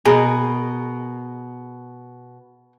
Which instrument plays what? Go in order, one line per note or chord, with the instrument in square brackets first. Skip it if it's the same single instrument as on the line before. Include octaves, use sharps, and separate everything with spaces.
[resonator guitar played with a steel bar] B2 [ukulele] G#4 A#4 D#5